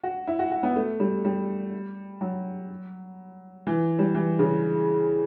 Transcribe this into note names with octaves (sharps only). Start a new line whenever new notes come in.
F#4
E4
F#4
F#4
B3
A3
G3
G3
F#3
E3
G3
E3
C#3